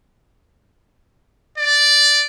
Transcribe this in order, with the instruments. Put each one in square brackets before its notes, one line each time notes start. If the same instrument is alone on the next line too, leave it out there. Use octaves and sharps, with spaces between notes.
[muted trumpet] D5